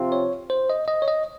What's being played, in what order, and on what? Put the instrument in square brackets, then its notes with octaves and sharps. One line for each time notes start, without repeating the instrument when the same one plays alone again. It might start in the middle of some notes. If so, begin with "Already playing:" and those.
Already playing: [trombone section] C3 F3 C4 F4
[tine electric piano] C#5
C5
D#5
D#5
C#5
D#5